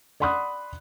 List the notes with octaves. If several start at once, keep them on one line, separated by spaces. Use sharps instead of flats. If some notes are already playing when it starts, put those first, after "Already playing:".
D5 F#5 B5 C6 D#6 F#6